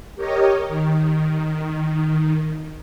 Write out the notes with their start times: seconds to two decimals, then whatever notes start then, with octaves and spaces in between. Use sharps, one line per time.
0.15 G4 A#4 C#5 D#5
0.68 D#3